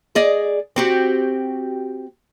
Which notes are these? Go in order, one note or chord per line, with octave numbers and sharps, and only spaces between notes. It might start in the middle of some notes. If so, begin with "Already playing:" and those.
G#4 D5 D#5
C4 F#4 G4